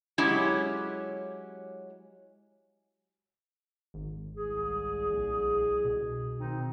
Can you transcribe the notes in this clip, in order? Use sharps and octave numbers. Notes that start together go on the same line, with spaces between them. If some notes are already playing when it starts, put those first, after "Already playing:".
F#3 G#3 C#4 E4 G4
G#1
C2 G#4
A#1
B2
D#3 C4 D#4